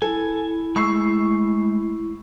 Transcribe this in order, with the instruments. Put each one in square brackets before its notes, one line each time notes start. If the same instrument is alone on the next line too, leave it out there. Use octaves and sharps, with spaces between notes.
[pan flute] E4 [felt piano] A4 [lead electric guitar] G#5
[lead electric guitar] G#3 A3 [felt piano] C#6 E6 C7